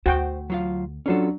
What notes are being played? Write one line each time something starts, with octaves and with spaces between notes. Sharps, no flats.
D2 F#4 C5 G5
F#3 F4 F5
F#3 C#4 D4 F4 A4